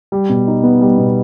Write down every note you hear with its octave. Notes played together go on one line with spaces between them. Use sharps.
G3
B2
D#4
B3
G3
B2